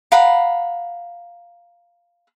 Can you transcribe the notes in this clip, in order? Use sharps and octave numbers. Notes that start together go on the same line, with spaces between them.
F5 F#5 A#5 B5